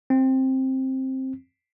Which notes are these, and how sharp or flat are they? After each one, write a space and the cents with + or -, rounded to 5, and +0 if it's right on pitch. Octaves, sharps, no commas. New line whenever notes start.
C4 +10